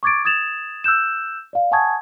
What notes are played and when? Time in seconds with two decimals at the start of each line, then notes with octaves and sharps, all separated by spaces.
0.03 C#6 D6 G#6 A6 D7
0.25 D#6 G#6 A6 E7 F7
0.84 E6 F#6 G6 E7
1.53 D5 F5
1.71 F#5 G#5 A5 C#6 D#6 G#6